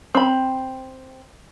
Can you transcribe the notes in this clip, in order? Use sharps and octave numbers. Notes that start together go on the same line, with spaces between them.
C4 B5